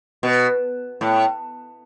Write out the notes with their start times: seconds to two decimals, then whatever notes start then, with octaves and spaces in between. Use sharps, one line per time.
0.23 B2
1.01 A2